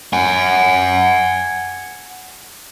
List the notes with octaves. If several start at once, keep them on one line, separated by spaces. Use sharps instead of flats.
F#5 G#5